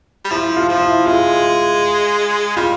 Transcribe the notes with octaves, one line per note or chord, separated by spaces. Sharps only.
G3
F3 E4
F4
F3
E4
G#3 F4
G3 F4